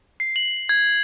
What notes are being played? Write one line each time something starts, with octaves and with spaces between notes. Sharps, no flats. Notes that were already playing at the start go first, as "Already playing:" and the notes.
C7
F#7
G#6